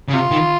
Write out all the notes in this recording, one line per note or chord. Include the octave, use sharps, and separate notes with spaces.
C#3
C3 F4
D#3